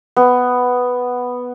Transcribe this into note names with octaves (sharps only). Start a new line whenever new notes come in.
B3